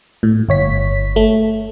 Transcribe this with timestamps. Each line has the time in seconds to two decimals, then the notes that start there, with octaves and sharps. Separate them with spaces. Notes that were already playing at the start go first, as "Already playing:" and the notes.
0.23 A2
0.49 G1 C#5 B6
1.16 A3